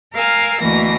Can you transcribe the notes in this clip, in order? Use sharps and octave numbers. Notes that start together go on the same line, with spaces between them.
A#4 F5 G#5 E6
D2 B2 E3 A#3 A#6